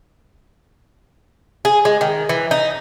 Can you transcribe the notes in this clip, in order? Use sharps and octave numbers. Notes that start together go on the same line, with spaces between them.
G#4
G#3
D#3
E3
D#4